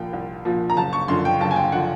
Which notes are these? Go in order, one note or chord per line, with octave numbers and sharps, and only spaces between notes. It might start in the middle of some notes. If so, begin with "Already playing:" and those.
Already playing: C2 A#2 F3 G5
C2
A#2 F3
A#5
F#1 A5
C#6
F#2 D3 F3 C6
G5
F#1 A5
G#5
G5
D3 F3 F#5